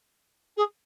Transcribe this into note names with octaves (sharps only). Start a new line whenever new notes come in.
G#4